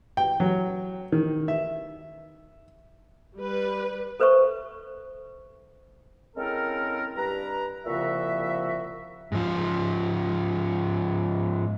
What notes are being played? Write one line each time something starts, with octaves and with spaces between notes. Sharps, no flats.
G5
F#3
D#3
E5
G3 B4
A4 B4 C5 E5 C#6
C#3 G#3 C4 E4 A4 A#4
G2 B4 A#5
C2 A#2 C#3 F3 F#4 E5
G#2 F3